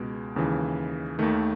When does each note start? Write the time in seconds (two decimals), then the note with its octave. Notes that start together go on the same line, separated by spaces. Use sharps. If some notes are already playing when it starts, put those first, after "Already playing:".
Already playing: C#2 B2 G#3
0.36 D#2 C#3 E3
1.19 D#2 D#3 A3